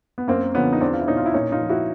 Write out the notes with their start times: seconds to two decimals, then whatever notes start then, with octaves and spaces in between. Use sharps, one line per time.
0.18 B3
0.28 F#2 A#3 C4
0.55 D3 F3 B3 C#4
0.73 D#4
0.81 E2 C4 D4
0.93 F4
1.01 E4
1.07 B2 C#4 D#4
1.17 F4
1.26 E4
1.34 A#2 C#4 D#4
1.52 D#4 F4
1.61 F3
1.69 E4 F#4